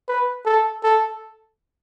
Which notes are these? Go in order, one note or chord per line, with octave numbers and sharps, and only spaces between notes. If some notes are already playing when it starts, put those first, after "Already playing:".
B4
A4
A4